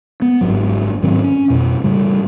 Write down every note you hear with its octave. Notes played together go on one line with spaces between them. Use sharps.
B3
G1 G#2 F#3
G#2 D#3 F#3 C4
C#4
F2 B2
A2 C#3 G3